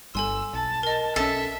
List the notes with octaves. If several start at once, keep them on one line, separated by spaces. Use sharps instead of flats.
G1 G2 G3 A4 G#5 C6 E6
B1 A5
A#4 D#5
B1 C#4 A4 E5